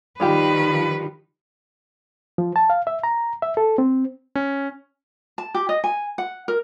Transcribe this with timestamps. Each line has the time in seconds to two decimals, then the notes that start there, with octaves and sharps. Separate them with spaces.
0.20 D#3 F3 G3 F4 G4 B4
2.38 F3
2.56 A5
2.70 F5
2.87 E5
3.04 A#5
3.42 E5
3.57 A4
3.78 C4
4.35 C#4
5.38 A5
5.55 G4
5.69 D#5
5.84 G#5
6.18 F#5
6.48 A#4